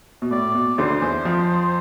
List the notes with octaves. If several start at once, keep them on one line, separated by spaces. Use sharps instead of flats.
B2
A2 D5
B2
D2 D3 C5
E2 E3
F2 F3